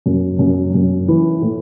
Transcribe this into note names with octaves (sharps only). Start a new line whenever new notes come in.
F#2
F#2
F#2
E3
A2